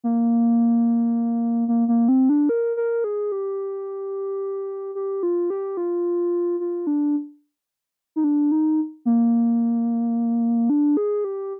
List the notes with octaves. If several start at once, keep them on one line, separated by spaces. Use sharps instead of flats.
A#3
A#3
A#3
C4
D4
A#4
A#4
G#4
G4
G4
F4
G4
F4
F4
D4
D#4
D4
D#4
A#3
D4
G#4
G4